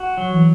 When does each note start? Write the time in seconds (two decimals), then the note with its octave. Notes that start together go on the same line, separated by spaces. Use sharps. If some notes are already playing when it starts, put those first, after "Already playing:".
Already playing: F#4
0.18 F#3
0.31 E3